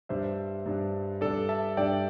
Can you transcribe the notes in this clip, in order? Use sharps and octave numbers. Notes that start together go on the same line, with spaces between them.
G2 G3 D4 C5 E5
G2 G3 D4
G2 G3 D4 A4 D5
E5 A5
G2 G3 D4 D5 G5